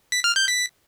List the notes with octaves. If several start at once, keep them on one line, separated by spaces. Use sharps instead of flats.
B6
F6
G6
B6